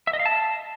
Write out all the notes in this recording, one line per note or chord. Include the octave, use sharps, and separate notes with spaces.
E5
D#5
F5
A5